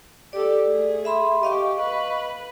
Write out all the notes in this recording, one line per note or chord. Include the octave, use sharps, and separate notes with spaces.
G4 A4 D5
A3 G#4
E5 B5 C6
G4 D#5 F5 C#6
B4